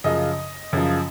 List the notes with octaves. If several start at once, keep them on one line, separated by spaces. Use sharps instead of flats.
F#2 C#3 F3 D#5
F#2 C#3 F3